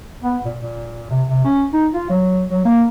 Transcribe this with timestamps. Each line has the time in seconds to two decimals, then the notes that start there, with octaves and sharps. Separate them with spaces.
0.23 B3
0.45 A#2
0.59 A#2
1.10 C3
1.28 C3
1.44 C#4
1.73 D#4
1.94 F4
2.09 F#3
2.51 F#3
2.65 A#3